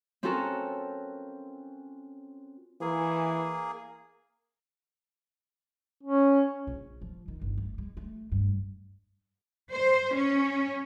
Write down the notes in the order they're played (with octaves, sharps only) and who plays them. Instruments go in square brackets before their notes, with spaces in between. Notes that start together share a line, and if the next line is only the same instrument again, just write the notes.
[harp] C4 C#4 F4 F#4 A4 A#4
[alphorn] E3 [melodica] A#3 G#4
[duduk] C#4
[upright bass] A#1
F3
D#3
G1
A3
G#3
A3
G2
[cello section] C5
C#4